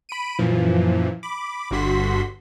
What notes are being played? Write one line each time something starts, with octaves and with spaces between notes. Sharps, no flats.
B5 D7 D#7
F#2 A#2 E3 F3
B5 D6
G1 G2 D3 F#4 C6 B6